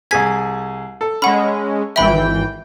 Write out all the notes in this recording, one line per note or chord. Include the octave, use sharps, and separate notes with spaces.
C2 G#4 G#5 G#6 B6
A4
G#3 C#4 F#5 B5
G#1 E3 E5 G5 B5